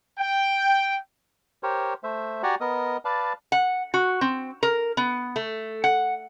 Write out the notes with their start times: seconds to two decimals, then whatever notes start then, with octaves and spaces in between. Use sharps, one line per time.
0.19 G5
1.63 G4 A#4 C5 C#5
2.04 A3 C5 E5
2.43 F#4 G4 D5 F#5 G#5 A#5
2.61 B3 A#4 D#5 D#6
3.05 B4 D5 F5 A5
3.52 F#5
3.94 F#4
4.21 C4
4.63 A#4
4.97 B3
5.36 A3
5.84 F#5